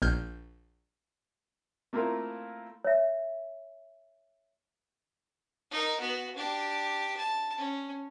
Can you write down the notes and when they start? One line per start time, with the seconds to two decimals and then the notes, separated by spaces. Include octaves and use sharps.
0.02 A#1 F6 G6
1.93 A3 A#3 C4 E4 F4 A#4
2.85 C#5 E5
5.71 D#4 A#4
6.00 B3 F#4
6.36 D4 G4
7.17 A5
7.58 C#4